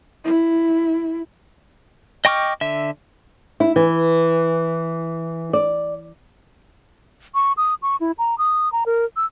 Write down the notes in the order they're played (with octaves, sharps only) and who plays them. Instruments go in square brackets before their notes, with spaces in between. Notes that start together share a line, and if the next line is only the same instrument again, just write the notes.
[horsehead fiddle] E4
[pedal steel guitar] D#5 G5 C#6 D6 F6
D3 E5
[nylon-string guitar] E4
E3
D5
[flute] C#6
D#6
C#6
E4
A#5
D#6
A#5
A#4
E6